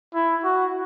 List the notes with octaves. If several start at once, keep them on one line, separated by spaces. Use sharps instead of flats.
E4
F#4